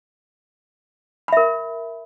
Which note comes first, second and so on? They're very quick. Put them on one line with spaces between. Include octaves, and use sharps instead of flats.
B5 E5 A#4